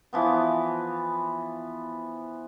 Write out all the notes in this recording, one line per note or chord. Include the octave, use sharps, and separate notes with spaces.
E3 F3 B3